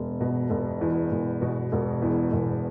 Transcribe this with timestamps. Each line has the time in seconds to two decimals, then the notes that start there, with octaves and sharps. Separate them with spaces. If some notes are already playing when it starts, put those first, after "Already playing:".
Already playing: E1
0.20 B2
0.50 E1
0.81 E2
1.11 E1
1.41 B2
1.72 E1
2.02 E2
2.32 E1